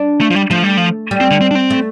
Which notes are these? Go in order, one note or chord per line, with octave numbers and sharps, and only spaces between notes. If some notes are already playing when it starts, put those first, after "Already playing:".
Already playing: D4
A3
F3
G3
F3 A3
G3
F3
G3
C4
D3
C4
D4
C4
A3